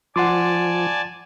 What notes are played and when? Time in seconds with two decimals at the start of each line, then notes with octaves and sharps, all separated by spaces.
0.16 F3 D5 F#5 G#5 A5 C6 D6